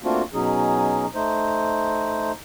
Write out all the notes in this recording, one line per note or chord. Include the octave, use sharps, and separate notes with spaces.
A3 A#3 C4 D4 F4 F#4
B2 F#3 C#4 D#4 G#4
A3 D#4 C5